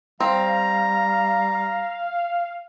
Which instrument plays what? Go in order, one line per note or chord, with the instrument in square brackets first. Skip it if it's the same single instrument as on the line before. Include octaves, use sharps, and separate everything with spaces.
[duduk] G3 [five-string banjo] C4 [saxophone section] F5 [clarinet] A#5